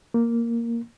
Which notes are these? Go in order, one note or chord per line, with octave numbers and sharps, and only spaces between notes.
A#3